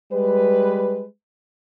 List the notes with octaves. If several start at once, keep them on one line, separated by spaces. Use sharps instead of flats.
G3 G#3 B4